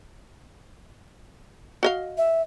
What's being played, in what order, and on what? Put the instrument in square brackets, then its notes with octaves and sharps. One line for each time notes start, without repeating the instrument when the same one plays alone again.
[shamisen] F#4 D#5 F5
[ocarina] E5